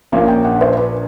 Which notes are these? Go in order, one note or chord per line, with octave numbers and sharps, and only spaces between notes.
A#1 A#2 F3 A#3 C#4 F5
G5
F#5
C5
B4